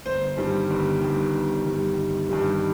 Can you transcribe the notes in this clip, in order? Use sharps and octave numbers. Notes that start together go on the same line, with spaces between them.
G1 C5
G2 D#3 G3
G1
G2 D#3 G3
G1
G2 D#3 G3
G1
G2 D#3 G3